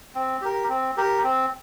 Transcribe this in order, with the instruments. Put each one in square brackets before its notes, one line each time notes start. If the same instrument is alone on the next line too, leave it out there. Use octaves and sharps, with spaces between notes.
[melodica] C4
G4 A#4
C4
G4 A#4
C4